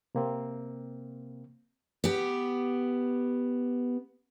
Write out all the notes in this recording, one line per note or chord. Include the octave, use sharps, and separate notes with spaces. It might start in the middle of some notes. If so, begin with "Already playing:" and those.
C3 A#3 C4
B3 G4